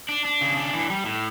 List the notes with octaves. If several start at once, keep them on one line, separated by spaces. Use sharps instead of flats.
D4
D4
C#3
D4
E3
G3
A2